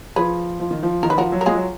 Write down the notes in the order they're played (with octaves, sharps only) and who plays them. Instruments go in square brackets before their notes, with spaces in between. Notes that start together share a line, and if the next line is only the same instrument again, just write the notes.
[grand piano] F3 [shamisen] G#4 B4
[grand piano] F3
D#3
F3
[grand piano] D#3 [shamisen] A#4
[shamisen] B4
[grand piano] F3 [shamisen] F#4 A#4
[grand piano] F#3
[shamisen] A#4
[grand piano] G#3 [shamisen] F4 G#4
[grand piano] F#3